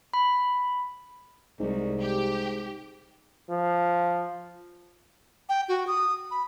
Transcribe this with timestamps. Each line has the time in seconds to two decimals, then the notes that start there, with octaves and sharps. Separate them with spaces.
0.14 B5
1.60 C2 G#2
2.00 G4
3.50 F3
5.49 G5
5.69 F#4
5.87 D#6
6.31 B5